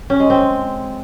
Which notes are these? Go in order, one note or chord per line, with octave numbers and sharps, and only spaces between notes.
C#4
G#3
C4